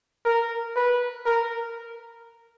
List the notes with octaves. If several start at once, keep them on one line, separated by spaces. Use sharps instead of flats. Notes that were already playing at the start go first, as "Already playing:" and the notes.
A#4
B4
A#4